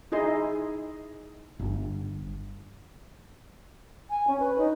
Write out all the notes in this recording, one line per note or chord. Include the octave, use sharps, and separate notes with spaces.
D#4 E4 G#4 D#5 C6
G1
G#5
C#4
B4
D#4